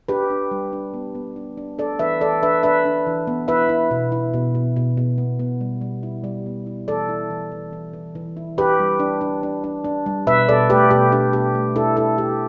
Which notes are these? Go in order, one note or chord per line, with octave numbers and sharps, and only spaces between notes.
D4 G4 B4
D4
G3
D4
B3
B3
D4
D4
D4 A4 D5
E3 B4 E5
E3 A4 D5
D4 B4 E5
D4 B4 E5
D4
E3
B3
E4 B4 E5
E4
B2
E4
B2
B2
B2
B2
B3
B3
G3
G3
E4
G3
B3
E4
E3 A4 D5
E4
E3
E3
E3
E3
E3
E4
D4 G4 B4
G3
D4
D4
D4
D4
D4
G3
B2 B4 E5
B2 A4 D5
A3 G4 B4
B2 G4
D4 G4
B2 G4
A3
D4 E4 A4
E4 A4
E4 G4